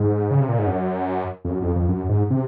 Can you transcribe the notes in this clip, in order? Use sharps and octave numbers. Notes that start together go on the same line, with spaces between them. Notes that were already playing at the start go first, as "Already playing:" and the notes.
Already playing: G#2
C#3
C3
A#2
G#2
F#2
F2
F#2
F2
F2
F#2
G#2
C3